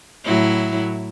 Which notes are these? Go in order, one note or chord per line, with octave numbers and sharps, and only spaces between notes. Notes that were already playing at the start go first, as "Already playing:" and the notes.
A2 F#3 E4